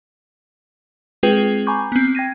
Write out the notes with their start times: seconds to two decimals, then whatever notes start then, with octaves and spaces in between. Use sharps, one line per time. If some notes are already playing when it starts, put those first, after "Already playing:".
1.23 G#3 C4 F4 G#4 B4 G5
1.67 G#5 A#5 B5 C#6 D6 G6
1.92 B3 C4
2.15 G5 G#6 A#6 D#7